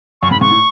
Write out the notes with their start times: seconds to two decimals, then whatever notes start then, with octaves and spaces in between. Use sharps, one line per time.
0.22 F#2 C#6
0.31 G#2 B5
0.41 G#2 C#6
0.51 A2